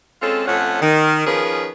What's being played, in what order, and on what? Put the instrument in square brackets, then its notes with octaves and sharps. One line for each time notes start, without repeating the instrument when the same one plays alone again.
[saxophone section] G#3 C4 C#4 F4 A4
F2 A3 C#4 F4 C#5 F#5
D#3
D#3 F3 C#4 G#4 A#4 B4